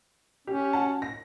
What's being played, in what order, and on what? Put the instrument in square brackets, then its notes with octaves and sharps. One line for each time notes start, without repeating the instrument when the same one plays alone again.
[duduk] C#4 [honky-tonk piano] G4
[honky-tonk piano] F#4 F#5 A5
A#6